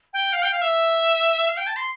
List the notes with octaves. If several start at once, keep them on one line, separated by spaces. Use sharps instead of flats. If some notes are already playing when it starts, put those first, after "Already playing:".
G5
F5
G5
F5
E5
F5
G5
A5
C6